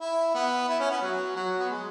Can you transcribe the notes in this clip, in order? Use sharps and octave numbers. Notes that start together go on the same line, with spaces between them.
E4
B3
E4
C#4
B3
F#3
F#3
B3
G#3